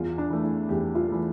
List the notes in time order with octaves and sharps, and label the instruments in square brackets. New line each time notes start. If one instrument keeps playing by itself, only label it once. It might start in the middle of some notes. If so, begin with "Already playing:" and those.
Already playing: [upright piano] E2 F4
D4
E3 A3
E4
E2 G4
F4
E3 A3